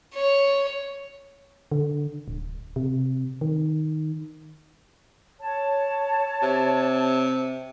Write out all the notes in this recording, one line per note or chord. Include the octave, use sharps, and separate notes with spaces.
C#5
D3
D1
C3
D#3
C#5 A5
C3